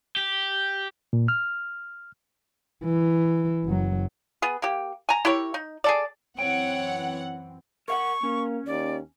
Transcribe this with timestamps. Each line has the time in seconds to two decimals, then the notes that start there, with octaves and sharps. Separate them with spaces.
0.17 G4
1.13 A#2
1.28 F6
2.84 E3
3.65 F#1 F#3
4.42 B3 G#4
4.62 A#3 G4
5.09 G#5 A#5
5.25 E4 G4 A#4 C#5
5.54 D#4
5.84 G#4 A4 D5
6.39 F#2 E3 C4 C#5 F#5 G5
7.88 A#4 F5 F#5 C#6
8.23 A#3 C#4
8.66 D#2 D5